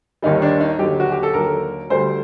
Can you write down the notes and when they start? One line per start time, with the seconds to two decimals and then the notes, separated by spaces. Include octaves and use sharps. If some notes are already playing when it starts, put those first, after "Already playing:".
0.22 D#2 D#3 G3 D#4
0.42 D4
0.60 D#4
0.79 D#2 D3 F#3 G4
1.00 F#4
1.12 G4
1.23 A4
1.34 D#2 D3 F#3 A#4
1.90 D2 D3 G3 C5